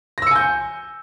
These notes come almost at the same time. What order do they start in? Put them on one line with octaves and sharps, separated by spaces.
A#6 E6 C#7 G#5 G6